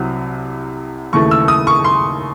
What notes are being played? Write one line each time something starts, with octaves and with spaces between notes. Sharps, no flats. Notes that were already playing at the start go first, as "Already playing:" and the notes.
Already playing: C2 C3 F#3
D#2 C#3 E3 A3 C#6
E6
D#6
C#6
C6